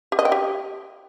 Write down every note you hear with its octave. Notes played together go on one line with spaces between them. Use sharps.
G4
D#5
G5
G4